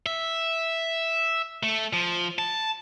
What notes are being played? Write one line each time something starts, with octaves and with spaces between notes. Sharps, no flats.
E5
A3
F3
A5